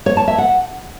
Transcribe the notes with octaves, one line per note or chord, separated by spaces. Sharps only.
C#5
A5
E5
F#5